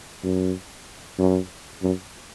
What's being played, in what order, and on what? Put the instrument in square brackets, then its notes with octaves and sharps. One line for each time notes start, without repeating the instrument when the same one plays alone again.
[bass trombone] F#2
F#2
F#2